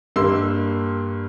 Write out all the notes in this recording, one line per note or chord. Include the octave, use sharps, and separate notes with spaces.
G2 A#3 C6 E6